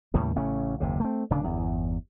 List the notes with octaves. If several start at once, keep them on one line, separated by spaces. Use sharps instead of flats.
D#2 A2 C#3 G3
A1 C#3 A3 C#4
F#1 D#2 C3
A3 C4
D1 C#3 D4
G1 E2